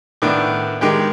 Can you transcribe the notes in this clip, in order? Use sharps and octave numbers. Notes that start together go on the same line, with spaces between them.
A2 D#3 B3 D4
D#3 G#3 G4 G5